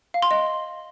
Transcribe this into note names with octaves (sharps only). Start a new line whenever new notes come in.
F5
C6
D#5